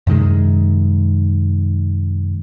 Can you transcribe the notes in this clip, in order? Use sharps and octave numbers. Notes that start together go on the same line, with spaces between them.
F#2 C3 D#3 G#3